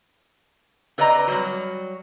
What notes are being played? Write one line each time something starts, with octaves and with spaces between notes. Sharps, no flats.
C4 B4 D5 D#5 A#5
F#3 G3